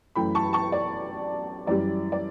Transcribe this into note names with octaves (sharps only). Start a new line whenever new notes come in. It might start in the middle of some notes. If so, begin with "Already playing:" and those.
F#2 E3 A3 G5 B5
A5 C#6
A5 C#6
D5
F#2 E3 G3 D5
D5